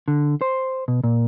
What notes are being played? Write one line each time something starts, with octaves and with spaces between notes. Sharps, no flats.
D3
C5
B2
A#2